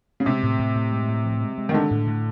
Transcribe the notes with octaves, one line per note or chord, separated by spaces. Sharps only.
C#3
C3 G#3
A2
A2
A2
G#3
A2
F3
G#3
G#3
D#3
D3 G#3
A2
A2